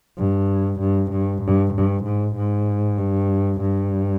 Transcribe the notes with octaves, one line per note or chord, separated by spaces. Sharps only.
G2
G2
G2
G2
G2
G#2
G#2
G2
G2